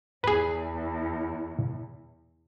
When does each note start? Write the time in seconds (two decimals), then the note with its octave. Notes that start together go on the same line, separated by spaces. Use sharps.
0.24 E2 G#4 B4